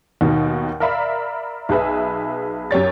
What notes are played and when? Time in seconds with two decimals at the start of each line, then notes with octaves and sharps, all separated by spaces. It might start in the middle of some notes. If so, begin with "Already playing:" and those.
0.21 D#2 B2 D#3
0.80 A#4 D5 E5 F5 B5
1.69 B1 G#4 B4 E5
2.71 F#2 G4 C#5 A6